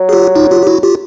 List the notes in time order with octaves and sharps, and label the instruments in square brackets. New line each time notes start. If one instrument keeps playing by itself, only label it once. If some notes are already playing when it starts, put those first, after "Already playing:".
Already playing: [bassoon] F#3
[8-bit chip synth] G#4
F4 G4
D#4 F4
F4 G4
G4
E4 F#4
F4 G4